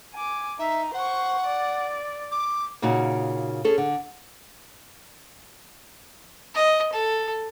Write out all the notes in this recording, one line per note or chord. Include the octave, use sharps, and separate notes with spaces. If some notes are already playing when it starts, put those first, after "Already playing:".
G#5 D6
D#4 E5 A#5
C5 F#5 C#6
D5
D6
A#2 C#3 D#4 F#4
C#4 G#4 A4
D3
D#5
A4